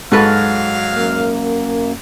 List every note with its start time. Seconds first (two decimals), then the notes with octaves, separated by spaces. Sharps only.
0.12 G#2 F#3 F#4 A4 B4 F5 F6
0.94 F#2 A#3